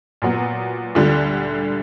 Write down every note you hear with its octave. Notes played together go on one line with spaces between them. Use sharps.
A#2 F#3 B3
D2 D3 G3